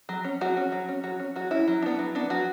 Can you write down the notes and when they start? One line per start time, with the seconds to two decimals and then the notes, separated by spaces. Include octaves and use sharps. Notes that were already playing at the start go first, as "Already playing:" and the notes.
0.09 F#3
0.24 C#4
0.41 F#3 F#4
0.57 C#4
0.72 F#3
0.89 C#4
1.04 F#3 F#4
1.20 C#4
1.36 F#3 F#4
1.51 C#4 E4
1.68 F#3
1.82 B3 D4
1.99 F#3
2.15 B3 D4
2.30 F#3 F#4